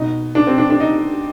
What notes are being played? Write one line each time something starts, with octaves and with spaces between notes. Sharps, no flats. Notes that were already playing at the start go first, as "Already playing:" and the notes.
Already playing: B2 D#4
D4
C4
D4
D4
D#4